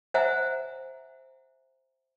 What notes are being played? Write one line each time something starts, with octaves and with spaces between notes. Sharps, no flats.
C5 E5 F#5 G#5 A#5